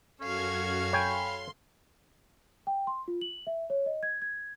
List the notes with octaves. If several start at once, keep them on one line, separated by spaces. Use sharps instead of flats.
F#2 C#4 F#4 A4 F5 G#6
C#5 G5 G#5 B5 C6
G5
C6
F4
F#7
E5
C#5
D#5
G#6
G#6